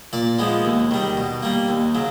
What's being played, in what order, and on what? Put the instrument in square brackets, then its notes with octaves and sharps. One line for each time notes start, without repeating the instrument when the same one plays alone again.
[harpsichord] A#2 D5
F3 G#3 B3
D#2
D#3 G3
B2
G3 A#3
D#2
C#3 F#3